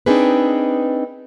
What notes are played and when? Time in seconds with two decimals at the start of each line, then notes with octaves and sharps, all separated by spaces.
0.06 C4 D4 D#4 G#4 A#4 B4